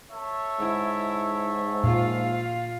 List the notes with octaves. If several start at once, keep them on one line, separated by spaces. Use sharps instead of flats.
A4 C#5 E5
G#2 E4
A#2 F4 F5